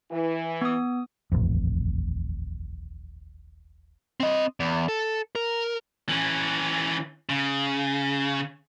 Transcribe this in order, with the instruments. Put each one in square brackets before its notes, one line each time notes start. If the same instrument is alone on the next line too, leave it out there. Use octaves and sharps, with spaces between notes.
[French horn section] E3
[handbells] B3 D#6
[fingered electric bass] D#1 A1 F2
[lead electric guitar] C4 D#5
E2
A4
A#4
E3 C#4
C#3